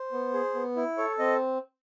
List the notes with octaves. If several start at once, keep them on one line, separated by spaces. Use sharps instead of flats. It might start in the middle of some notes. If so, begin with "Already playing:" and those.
Already playing: C5
B3
G#4
B3
E4
A4 C#5
C4 D#5